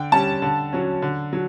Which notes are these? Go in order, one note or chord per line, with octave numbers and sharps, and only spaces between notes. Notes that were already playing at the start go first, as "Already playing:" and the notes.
Already playing: D3 G5
G3 C#4 A5
D3
F#3 C#4
D3
F#3